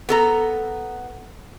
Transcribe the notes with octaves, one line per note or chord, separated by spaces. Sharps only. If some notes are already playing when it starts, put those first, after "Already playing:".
B3 A4 A#5